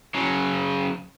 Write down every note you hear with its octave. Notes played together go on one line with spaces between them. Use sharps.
C#3 F#3